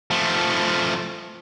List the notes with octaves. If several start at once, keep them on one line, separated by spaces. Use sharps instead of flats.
F3 A3